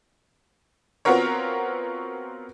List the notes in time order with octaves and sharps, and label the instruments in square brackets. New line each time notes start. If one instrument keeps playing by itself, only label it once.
[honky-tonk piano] B3 C4 F4 F#4 A#4 C#5